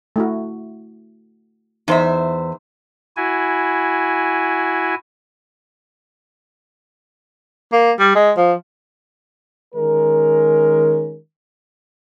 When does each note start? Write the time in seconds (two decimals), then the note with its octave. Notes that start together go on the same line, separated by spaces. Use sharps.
0.16 A3 E4 F#4
1.88 E2 D#4 C5 E5
3.17 E4 F#4 G#5
7.73 A#3
7.99 G3
8.16 G#3
8.37 F3
9.75 D#3 G#3 C#4 A#4